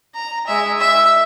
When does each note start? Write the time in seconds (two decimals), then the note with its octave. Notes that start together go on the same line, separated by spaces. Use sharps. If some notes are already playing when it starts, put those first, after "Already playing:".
0.15 A#5
0.47 G#3 E5
0.80 E5